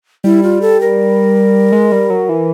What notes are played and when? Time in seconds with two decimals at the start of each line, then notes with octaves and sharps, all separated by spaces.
0.24 G3 E4
0.43 F4
0.62 A4
0.81 A#4
1.72 G#3
1.92 G3
2.10 F#3
2.29 E3